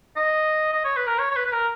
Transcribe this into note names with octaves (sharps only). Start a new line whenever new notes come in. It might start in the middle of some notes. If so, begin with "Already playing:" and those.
D#5
D#5
C#5
B4
A#4
C#5
C#5
B4
B4
A#4